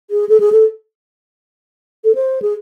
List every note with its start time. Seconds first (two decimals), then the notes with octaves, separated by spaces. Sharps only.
0.11 G#4
0.29 A4
0.40 G#4
0.52 A4
2.04 A4
2.15 C5
2.42 G#4